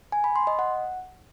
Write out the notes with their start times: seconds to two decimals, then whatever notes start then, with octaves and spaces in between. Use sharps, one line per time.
0.12 G#5
0.24 B5
0.36 C6
0.47 D#5
0.59 F#5